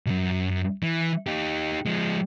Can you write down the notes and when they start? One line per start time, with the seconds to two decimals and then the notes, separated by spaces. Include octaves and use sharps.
0.06 B1 F#2
0.83 E3
1.27 D#4 G4
1.86 F3 G#3